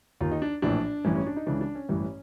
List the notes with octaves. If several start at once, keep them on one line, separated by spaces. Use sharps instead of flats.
D#2 D#3 F4
D#4
D4
A#1 A2 E3 D4
A1 G2 E3 C#4
C#4
D4
D#4
C#2 C#3 E3 D4
D4
C#4
A1 G2 E3